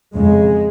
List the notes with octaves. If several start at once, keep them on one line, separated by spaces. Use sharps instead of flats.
F2 C#3 G#3